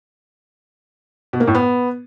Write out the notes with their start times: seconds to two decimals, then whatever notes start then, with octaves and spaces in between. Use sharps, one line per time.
1.33 B2
1.40 A#3
1.47 A2
1.55 B3